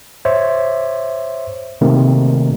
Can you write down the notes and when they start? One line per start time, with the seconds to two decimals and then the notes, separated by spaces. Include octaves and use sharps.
0.25 C5 C#5 E5
1.81 C3 D#3 A3 A#3 C4